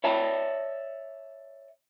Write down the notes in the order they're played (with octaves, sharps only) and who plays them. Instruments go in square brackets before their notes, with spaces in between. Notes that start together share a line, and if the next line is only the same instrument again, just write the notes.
[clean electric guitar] C#5 D5 E5 A5